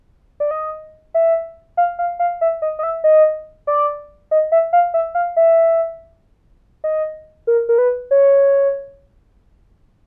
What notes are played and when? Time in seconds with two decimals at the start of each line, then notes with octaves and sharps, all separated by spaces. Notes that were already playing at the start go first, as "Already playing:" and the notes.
0.40 D5
0.51 D#5
1.14 E5
1.77 F5
1.99 F5
2.19 F5
2.41 E5
2.62 D#5
2.79 D#5
2.83 E5
3.04 D#5
3.67 D5
4.31 D#5
4.52 E5
4.73 F5
4.94 E5
5.15 F5
5.37 E5
6.84 D#5
7.47 A#4
7.69 A#4
7.78 B4
8.11 C#5